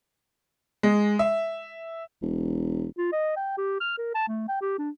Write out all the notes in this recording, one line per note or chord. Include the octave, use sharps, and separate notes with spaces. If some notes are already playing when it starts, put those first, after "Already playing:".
G#3
E5
E1
F4
D#5
G5
G4
F6
A#4
A5
A3
G5
G4
D4